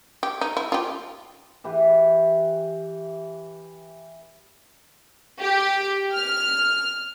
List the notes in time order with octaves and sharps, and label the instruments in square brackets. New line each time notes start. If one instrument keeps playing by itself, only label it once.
[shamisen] G4
D#4
E4
F4 G4
[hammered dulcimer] E3 G4 B4
[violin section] G4
F6